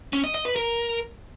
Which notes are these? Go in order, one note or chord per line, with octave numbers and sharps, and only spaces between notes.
C#4
D#5
D#5
B4
A#4